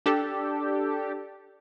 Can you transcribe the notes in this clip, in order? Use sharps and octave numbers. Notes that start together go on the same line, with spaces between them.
D4 G4 A4